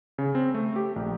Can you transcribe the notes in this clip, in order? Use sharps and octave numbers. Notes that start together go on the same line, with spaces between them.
C#3
C4
A3
G4
A#1